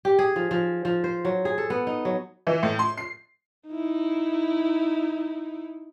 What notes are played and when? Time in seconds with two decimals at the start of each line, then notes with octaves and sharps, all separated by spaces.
0.05 G4
0.19 G#4
0.36 F3
0.51 F3
0.85 F3
1.04 C5
1.25 F#3
1.45 G#4
1.58 A4
1.70 B3
1.87 D#4
2.05 F#3
2.47 E3
2.63 A2
2.79 C6
2.98 C7
3.68 D#4 E4